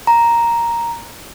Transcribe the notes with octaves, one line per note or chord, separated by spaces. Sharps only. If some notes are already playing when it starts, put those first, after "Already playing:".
A#5